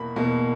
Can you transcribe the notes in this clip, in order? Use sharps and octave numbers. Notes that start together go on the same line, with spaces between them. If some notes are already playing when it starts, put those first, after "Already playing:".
Already playing: E2 B2 A#3 B5
E2 B2 A#3